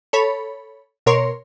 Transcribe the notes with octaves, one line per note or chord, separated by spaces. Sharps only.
A4 C#5 B5
B2 A#4 C#5 C6